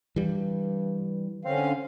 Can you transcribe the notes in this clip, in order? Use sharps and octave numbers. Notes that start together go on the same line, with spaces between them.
G2 E3 G3
D3 C4 C#4 F5